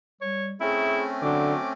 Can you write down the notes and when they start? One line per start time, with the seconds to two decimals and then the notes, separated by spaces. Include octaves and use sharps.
0.21 G3 C#5
0.61 A3 C4 C#4 E4 G#4
1.22 D3 F#3 D6